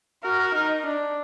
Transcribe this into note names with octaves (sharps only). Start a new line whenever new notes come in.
F#4 A#4
A#4
D#4 A#4
D4